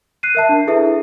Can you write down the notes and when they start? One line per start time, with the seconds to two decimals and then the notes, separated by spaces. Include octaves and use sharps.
0.23 F#6 C7 D#7
0.35 A#4 E5 A5
0.49 D4
0.67 E4 G#4 A4 B4 E5